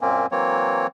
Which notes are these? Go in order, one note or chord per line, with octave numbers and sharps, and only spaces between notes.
F#2 A#2 A#3 C4 C#4
E3 F#3 A#3 C4 C#5